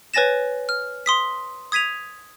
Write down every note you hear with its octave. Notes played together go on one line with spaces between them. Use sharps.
B4 C#5 G#5 A6 A#6 E7
F6
C6 D#6 B6
D#6 G#6 B6 D#7 F7